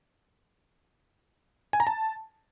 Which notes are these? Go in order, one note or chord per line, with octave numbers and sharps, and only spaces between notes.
G#5
A#5
A5